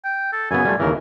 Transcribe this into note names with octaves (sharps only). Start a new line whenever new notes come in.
G5
A4
F#2 C#3 B3 G#5
G3 A3 F4
D#2 C#3 E3 A#4